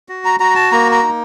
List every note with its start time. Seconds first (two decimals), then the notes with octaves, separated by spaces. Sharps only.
0.09 F#4
0.25 A#5
0.40 F#4 A#5
0.55 A5
0.72 A#3 A#5
0.92 A#5
1.03 D#4